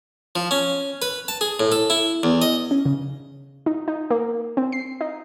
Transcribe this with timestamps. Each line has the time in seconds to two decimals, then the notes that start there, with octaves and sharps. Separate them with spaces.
0.36 F3
0.51 C#4
1.02 B4
1.28 A5
1.41 G#4
1.60 A2
1.72 A4
1.90 E4
2.23 E2
2.42 D#5
2.71 C#4
2.85 C#3
3.66 D#4
3.88 D#4
4.11 A#3
4.57 C4
4.72 C7
5.01 D#4